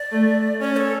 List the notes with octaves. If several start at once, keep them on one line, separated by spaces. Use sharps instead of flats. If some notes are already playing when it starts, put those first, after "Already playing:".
Already playing: D5
A3
C#4 C#5
A4